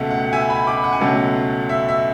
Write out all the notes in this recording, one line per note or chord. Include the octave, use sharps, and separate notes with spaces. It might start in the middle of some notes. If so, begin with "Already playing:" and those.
Already playing: C#2 B2 A3 F#5
F#5
E5 G#5
G#5 B5
B5 D6
F#5
G#5
C#2 B2 F#3 A3 F#5
E5
E5